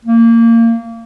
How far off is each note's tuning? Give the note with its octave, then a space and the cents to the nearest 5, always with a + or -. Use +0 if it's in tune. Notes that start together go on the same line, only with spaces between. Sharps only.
A#3 -25